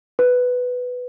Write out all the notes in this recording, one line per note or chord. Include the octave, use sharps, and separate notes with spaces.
B4